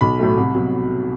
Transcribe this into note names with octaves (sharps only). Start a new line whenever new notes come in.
B1 B5
A2 F#3 A3
C2
B2 F#3